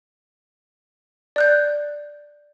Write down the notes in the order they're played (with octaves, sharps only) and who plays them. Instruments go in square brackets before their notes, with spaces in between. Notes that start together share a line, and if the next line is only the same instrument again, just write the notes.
[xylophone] D5 F#6 G6